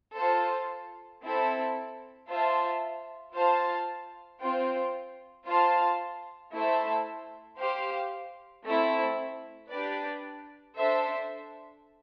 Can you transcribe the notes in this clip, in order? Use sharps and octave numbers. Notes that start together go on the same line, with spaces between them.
F4 A4 C5
C4 E4 A4
F4 C5 E5 A5
F4 C5 F5 A5
C4 F4 C5 G5
F4 C5 F5 A5
A3 E4 A4 C5 E5
G4 C5 F5
A3 C4 E4
D4 G4 B4 D5
D4 A4 C5 E5